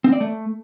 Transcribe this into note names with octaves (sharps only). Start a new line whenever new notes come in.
C4
D5
A3